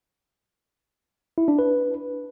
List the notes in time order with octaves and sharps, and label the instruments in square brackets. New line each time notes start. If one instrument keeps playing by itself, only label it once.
[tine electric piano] E4
D4
B4